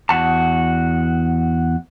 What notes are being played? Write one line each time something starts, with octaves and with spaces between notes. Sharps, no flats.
E2 F#4 A5